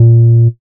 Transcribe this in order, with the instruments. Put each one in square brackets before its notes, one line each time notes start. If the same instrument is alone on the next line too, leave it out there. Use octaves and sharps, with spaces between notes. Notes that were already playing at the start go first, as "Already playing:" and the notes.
Already playing: [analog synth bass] A#2